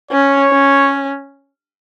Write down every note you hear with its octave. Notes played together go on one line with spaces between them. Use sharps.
C#4 C#5
C#4